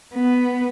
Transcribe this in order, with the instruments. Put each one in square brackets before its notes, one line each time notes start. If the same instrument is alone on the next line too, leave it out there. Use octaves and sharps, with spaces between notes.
[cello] B3